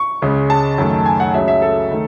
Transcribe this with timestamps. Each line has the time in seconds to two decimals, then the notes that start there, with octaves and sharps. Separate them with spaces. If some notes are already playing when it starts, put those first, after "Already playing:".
Already playing: C#6
0.22 C#2 C#3 G#3
0.50 A5
0.78 F#2 D#3 A3
1.06 G#5
1.20 F#5
1.34 C#2 C#3 F#3 E5
1.48 E5
1.62 A4
1.91 D#3 A3